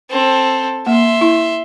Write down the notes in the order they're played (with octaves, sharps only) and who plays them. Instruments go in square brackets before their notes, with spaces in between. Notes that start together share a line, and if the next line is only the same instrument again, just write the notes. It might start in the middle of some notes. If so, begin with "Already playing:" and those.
[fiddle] C4 A4
[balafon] A#3 [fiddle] E5 C6
[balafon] E4